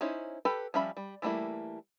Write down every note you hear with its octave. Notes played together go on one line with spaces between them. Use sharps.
C#4 D#4 E4 C5 C#5
G4 A4 B4 G5
F3 G3 C#4 E5 B5
G3
E3 G3 A3 A#3 E4